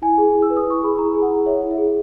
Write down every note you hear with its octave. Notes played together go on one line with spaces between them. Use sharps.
E4 G#5
G#4
E4
E6
B4
D#6
E4 C#6
G#4 B5
E4 A#5
G#4
F#5
E4
C#5 E5
E4
E5
G#4